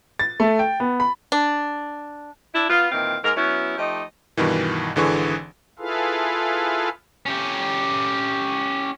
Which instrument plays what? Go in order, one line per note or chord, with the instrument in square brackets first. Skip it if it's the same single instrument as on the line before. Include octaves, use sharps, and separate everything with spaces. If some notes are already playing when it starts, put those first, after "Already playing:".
[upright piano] A6
A3
G5
B3
B5
[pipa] D4
[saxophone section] D4 E4
B3 F4
A#2 D#3 E3 C4 F5
G#2 A#4
F#3 B3 C#4 E4
F3 A3 D#4 G4 D#5
[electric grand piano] G2 B2 D#3 E3
G#1 D3 E3 G#4 C#6
[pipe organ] E4 F4 G#4 A4 B4 F5
[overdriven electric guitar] C#4 G4